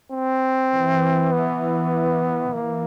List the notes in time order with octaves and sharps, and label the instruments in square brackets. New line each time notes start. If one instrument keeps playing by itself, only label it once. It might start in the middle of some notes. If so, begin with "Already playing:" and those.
[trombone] C4
[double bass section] E3
[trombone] B3
[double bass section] E3 [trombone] A#3